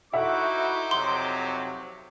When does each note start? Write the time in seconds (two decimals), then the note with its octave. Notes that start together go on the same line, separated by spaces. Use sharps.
0.13 D#4 E4 F#4 A4 C5 E5 F#5 D6
0.91 F2 C3 F#3 C6